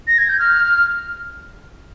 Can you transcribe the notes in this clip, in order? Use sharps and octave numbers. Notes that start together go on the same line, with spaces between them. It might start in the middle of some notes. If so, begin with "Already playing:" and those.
A#6
G#6
G6
F6